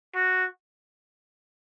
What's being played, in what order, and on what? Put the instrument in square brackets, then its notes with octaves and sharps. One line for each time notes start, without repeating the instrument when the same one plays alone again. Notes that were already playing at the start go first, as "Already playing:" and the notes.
[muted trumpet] F#4